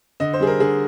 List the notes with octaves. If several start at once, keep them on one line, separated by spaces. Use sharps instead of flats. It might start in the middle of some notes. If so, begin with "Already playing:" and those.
D3 D#5
C5
G3 G#4
A#4
D3 G#4